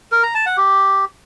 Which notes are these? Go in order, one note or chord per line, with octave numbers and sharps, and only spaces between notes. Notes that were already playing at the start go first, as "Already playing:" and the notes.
A#4
A#5
A5
F#5
G4